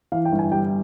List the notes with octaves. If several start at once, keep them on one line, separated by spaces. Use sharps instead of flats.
E3 F5
G5
G1
G#5
G3 G5